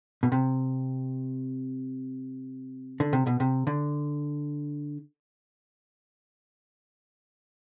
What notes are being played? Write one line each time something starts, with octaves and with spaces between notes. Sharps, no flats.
B2
C3
D3
C3
B2
C3
D3